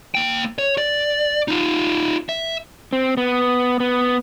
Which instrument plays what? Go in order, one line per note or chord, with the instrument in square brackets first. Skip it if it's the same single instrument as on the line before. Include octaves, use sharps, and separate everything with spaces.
[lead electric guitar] A#3 G5
C#5
D5
D#4 F4
E5
[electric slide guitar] C4
B3
B3